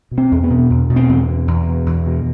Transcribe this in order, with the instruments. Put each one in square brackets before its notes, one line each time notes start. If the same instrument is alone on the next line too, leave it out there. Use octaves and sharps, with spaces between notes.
[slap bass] B2
C4
E2
B3
B2
E2
B2
C4
E2
B2
E2
B2
E2
B2